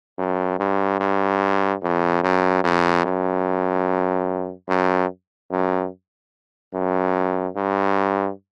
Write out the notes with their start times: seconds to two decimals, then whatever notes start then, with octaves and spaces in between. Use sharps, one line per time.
0.18 F#2
0.59 G2
1.00 G2
1.82 F2
2.23 F#2
2.64 F2
3.05 F#2
4.69 F#2
5.51 F#2
6.74 F#2
7.56 G2